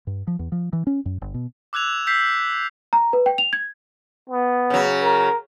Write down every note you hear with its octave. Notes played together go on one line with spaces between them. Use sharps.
G2
F3
E2
F3
E3
C#4
F#2
G1
B2
D6 E6 F#6 G#6 F7
E6 G6 B6 C7
A#5
B4
G5
F7
G#6
B3
C#3 F#3
A#4